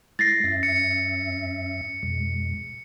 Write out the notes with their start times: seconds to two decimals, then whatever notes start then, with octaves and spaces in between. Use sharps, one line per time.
0.19 G#3 E4 A6 A#6 C7
0.44 F#2 C#4 E5
0.63 C#7
2.03 F2 B2 G#3